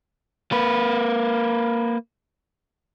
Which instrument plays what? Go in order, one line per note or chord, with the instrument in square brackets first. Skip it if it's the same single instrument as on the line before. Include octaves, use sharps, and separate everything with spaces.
[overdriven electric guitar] A#3 B4